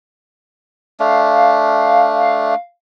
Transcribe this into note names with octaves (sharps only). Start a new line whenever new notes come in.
A3 D4 F5